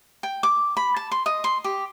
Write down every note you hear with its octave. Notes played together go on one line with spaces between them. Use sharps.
G5
D6
B5
A5
C6
D#5
C6
G4